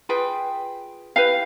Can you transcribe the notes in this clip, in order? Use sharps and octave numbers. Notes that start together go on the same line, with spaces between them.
F4 G#4 B4 G5
E4 G4 B4 F5